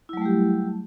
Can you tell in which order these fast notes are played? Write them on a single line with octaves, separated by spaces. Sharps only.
E4 F#3 A3 G3 G4